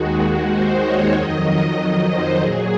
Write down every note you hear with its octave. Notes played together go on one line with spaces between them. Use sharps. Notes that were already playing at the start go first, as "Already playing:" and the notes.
Already playing: D#2 D#3 G#3 F#4
F#4
C5
C#5
F2 D#3 F#3 D#5
D#5
C5
A#2 F#3 G#4